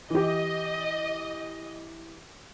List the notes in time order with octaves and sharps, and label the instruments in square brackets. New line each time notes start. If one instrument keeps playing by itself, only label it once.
[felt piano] E3 G4 [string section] D#5